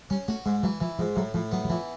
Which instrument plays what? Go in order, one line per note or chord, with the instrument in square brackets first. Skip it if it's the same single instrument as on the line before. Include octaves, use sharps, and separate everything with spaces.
[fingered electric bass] G3 [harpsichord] C#4
[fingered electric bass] A3 [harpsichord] F#4
[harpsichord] G#2 [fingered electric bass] G#3
[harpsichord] E3 [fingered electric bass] F#3
[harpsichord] E3 [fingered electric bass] F3
[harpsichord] G#2 [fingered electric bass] F3
[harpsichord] A2 [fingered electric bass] F#3
[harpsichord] A2 [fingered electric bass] F3
[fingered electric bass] F#3 [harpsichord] B3
[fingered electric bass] F#3
[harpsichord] E3 [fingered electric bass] F3